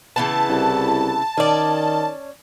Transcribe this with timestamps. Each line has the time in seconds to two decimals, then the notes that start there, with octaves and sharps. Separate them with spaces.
0.16 C#3 E3 B3 A5
0.49 C2
1.37 D#3 C#4 D5